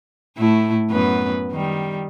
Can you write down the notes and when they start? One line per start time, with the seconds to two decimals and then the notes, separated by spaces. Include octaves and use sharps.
0.38 A2 A3 E4
0.90 F#2 B3 B4
1.52 D#3 G3